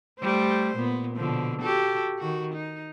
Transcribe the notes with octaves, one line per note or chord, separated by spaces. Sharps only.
G3 A3 C5
A#2 B3
B2 D3 F3
F#4 G4 A4
D#3 F#4
D#4